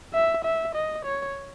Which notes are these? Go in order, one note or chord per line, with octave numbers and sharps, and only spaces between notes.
E5
E5
D#5
C#5